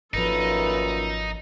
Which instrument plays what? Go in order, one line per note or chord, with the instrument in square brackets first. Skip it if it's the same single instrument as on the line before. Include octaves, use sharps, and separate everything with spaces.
[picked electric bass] G#1 F3 [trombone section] F#2 A#2 D#3 [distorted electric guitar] D#4 [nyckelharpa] A4 B4